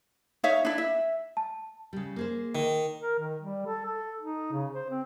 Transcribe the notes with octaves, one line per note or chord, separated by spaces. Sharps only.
D#4 C#5 E5 F5
D4 E4
E5
A5
C#3 G3
A#3 G#4 C5
D#3
A#4
D#3
G3
A4
A4
D#4
C#3
C5
C4